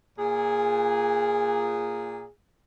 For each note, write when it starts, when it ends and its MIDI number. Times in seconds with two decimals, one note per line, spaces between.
0.19 2.28 46
0.19 2.28 68